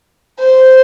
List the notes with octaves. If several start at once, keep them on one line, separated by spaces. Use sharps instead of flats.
C5